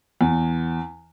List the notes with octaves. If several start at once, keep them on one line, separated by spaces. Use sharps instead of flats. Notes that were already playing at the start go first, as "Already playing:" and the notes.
E2